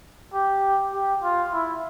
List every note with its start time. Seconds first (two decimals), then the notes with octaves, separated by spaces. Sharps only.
0.33 G4
0.93 G4
1.22 F4
1.52 E4